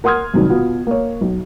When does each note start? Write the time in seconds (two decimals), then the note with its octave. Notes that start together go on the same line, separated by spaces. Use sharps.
0.04 A#4 F#5 C6 D#6 F6 G#6
0.34 F#2 C3 D#3 G3
0.50 B2 B3 F4
0.87 A#3 C#5
1.21 B1